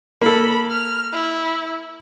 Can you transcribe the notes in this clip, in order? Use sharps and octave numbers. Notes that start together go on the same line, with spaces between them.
A#3 A4 B5
F6
E4